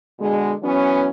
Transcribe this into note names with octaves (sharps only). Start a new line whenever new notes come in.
B2 D3 G#3
E3 F#3 B3 C#4